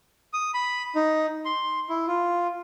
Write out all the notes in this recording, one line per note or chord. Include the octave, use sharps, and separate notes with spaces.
D#6
B5
D#4
C6
E4
F4